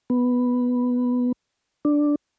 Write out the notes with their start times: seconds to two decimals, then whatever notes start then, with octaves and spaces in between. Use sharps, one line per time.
0.10 B3
1.85 D4